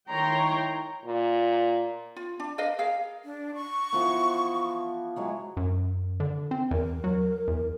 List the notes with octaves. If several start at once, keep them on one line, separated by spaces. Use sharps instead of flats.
D#3 E4 C#5 G5 A#5 C6
A#2
F4
D4
A#4 B4 D#5 F5
G#4 A#4 F5
D4
C#6
E3 F3 B3
E3 F#3 G#3
F#2
D3
C4
E2 A#4
F#3
E2